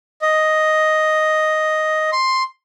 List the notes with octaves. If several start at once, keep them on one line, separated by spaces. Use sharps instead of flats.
D#5
C6